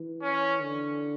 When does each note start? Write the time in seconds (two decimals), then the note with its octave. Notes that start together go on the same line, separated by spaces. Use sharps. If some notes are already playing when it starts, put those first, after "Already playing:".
Already playing: E3
0.22 C#4
0.60 D3